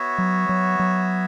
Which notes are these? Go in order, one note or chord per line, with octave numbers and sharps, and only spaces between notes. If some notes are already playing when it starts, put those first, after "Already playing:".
Already playing: B3 F#4 C#5 E5
F#3
F#3
F#3